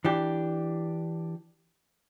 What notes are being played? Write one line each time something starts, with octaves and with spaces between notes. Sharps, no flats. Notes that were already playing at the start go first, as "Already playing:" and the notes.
E3 D4 G4